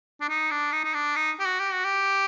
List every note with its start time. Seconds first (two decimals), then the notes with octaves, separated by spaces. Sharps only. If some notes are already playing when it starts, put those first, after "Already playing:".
0.21 D4
0.29 D#4
0.51 D4
0.72 D#4
0.84 D#4
0.94 D4
1.16 D#4
1.40 G4
1.45 F#4
1.59 G4
1.72 F#4
1.85 G4